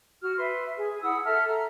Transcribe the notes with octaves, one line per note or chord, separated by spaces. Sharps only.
F#4 F6
B4 E5 C6
G#4
E4 F#5 D#6 E6
A4 E5 A5 F6
A#5